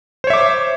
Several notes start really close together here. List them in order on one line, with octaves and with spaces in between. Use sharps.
C5 C#5 E5 D6